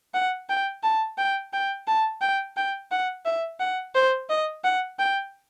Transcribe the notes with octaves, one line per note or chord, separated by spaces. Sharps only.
F#5
G5
A5
G5
G5
A5
G5
G5
F#5
E5
F#5
C5
D#5
F#5
G5